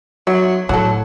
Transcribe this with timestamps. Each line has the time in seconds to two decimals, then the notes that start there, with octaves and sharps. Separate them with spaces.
0.27 F#3 E5
0.69 A2 F#3 F#4 A4